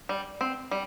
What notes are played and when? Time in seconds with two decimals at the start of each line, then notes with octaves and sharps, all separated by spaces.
0.09 G3
0.41 C4
0.71 G3